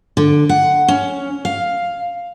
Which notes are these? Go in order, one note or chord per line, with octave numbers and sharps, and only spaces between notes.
D3
F#5
C#4
F5